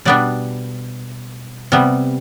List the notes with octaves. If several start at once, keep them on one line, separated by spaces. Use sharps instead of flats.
B2 G3 B3 D4 D5
C3 G3 B3